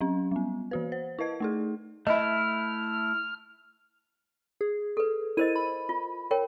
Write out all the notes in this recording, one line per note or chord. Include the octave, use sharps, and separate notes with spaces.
F#3 C#4
G3 B3
E3 F#4 B4
C5
E4 B4 D#5 G#6
A3 D#4 G#4
A3 E4 D#5 E5 F6
G#4
A4 B4
E4 A#4 C5 D#5 D#7
B5
F4
A#4 C#5 G5